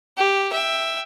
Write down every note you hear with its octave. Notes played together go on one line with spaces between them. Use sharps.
G4
E5 G5